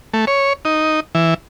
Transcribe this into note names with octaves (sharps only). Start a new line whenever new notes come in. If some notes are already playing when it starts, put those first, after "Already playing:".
A3
C#5
D#4
E3